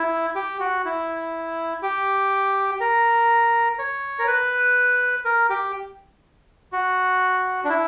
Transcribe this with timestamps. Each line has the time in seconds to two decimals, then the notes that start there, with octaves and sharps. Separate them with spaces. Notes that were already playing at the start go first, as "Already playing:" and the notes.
Already playing: E4
0.35 G4
0.60 F#4
0.85 E4
1.82 G4
2.80 A#4
3.79 C#5
4.19 A#4
4.27 B4
5.25 A#4
5.50 G4
6.73 F#4
7.64 D4
7.69 E4